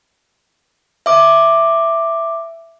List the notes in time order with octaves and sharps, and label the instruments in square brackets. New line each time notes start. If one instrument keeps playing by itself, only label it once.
[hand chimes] E5 D6